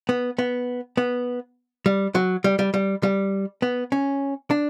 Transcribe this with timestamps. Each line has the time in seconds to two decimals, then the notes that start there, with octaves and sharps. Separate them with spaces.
0.09 B3
0.39 B3
0.97 B3
1.86 G3
2.15 F#3
2.44 G3
2.59 G3
2.74 G3
3.03 G3
3.62 B3
3.92 C#4
4.51 D4